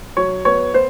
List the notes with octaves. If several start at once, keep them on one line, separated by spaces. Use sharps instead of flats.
F#3 C#5
B3 C#5
B3 C5